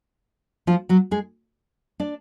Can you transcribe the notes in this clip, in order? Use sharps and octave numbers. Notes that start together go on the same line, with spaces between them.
F3 F4
F#3 F#4
G#3 G#4
D4 D5